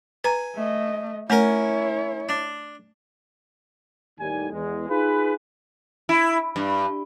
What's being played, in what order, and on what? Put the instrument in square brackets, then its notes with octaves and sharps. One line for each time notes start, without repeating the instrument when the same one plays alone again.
[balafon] B4 A#5 [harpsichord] G#5
[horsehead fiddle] A3 D#5
[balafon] A3 [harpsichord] C#4 A#4 [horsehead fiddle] E4 C#5
[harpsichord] D4
[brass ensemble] D#2 A2 G3 G#5
E2 G#3
D#4 F4 G#4 B4
[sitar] E4
G2